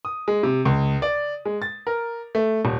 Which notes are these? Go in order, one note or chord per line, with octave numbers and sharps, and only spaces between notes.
D#6
G#3
C3
C#2
D5
G#3
A6
A#4
A3
D#1